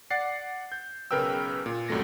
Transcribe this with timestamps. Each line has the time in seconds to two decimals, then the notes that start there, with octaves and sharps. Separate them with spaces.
0.11 D5 F#5 A6 C7
0.72 G6
1.11 B1 C#3 A#4 B4 G5 E6
1.66 A#2
1.89 C2 F#2 G3 A3 A#6